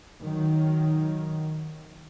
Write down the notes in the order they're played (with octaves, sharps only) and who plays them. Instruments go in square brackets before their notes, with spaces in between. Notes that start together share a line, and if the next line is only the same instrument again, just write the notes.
[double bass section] D#3 F#3